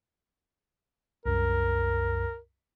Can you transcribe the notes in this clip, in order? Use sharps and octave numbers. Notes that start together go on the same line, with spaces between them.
C2 F#2 A#4